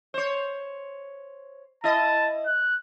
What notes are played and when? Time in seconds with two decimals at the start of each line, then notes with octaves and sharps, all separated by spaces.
0.14 C5 C#5
1.84 E4 D#5 A5
2.47 F#6